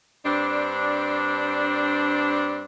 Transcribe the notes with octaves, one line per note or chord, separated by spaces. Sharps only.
G2 C4 D4